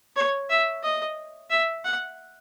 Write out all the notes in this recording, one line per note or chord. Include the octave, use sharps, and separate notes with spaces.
C#5
E5
D#5
E5
F#5